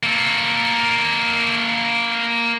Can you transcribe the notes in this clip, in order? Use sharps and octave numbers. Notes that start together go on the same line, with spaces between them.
A#3 A4